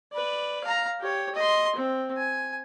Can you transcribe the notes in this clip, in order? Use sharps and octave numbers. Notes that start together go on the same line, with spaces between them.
B4 D5
F5 A#5
G4 C#5
D#5 C6
C4
G#5